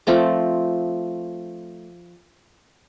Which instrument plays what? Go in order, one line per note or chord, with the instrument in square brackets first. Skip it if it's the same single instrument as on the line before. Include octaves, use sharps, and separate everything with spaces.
[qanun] F3 A3 C4 D6